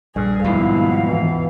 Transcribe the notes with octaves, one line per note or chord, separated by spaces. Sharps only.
A#1 G2 G#4
D#2 G#2 B2 F3 E4 F5
E3